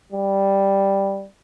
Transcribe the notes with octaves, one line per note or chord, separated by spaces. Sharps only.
G3